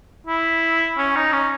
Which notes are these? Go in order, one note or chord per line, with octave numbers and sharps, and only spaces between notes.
E4
C#4
D#4
C#4